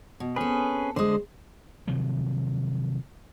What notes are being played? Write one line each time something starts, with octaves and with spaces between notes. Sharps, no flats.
B2
C4 C#4 G#4 A4 B4
D3 G#3 C5 D#6
C3 D#3 F3 F#3